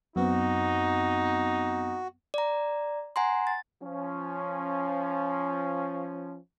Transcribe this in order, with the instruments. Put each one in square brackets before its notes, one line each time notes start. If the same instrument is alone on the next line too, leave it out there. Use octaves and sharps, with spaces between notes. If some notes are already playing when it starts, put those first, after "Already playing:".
[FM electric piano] F#2 B3 C4 [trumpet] D#4 [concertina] F#4
[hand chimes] D5 A#5
F#5 G#5 A#5 C6
A6
[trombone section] F3 C#4